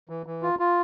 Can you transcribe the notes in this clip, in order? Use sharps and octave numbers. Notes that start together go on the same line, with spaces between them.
E3
E3
F4
F4